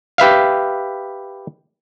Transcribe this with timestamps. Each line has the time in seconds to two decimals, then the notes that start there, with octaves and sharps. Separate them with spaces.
0.18 G4 B4 E5 F5